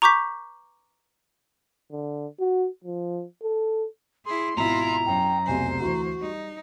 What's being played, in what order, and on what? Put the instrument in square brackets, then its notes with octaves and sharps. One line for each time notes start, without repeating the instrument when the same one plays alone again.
[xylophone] A#5 C#6 D6 G6 B6
[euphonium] D3
F#4
F3
A4
[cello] E4 G#4 [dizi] C6
[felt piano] G#1 B2 [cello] E4 F4 [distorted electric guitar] A#5
[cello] F#2 [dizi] G5
[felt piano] F1 C2 B2 [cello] C5 [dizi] G#5
[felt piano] D2 E3 [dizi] F#4
[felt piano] G3 [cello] D#4